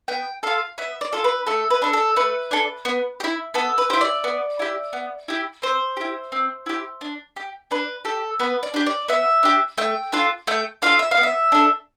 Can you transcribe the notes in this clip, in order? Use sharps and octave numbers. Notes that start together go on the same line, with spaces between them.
B3 G5
F4 A4 F5
B3 E5
D5
F4 A4
B4
A3 A4
B4
D4 A4
A4
A3 B4
D4 A4
B3
G4
E4
B3 A4
B4
E4 G4 C5
D5
B3
E4 G4
B3
E4 G4
C4 C5
E4 G4
C4
E4 G4
D4
G4
D4 B4
G4 A4
B3 B4
D5
D4 G4
D5
B3 E5
D4 G4
A3 G5
D4 F4 A4
A3 G5
D4 F4 A4 F5
E5
F5
B3
E5
D4 A4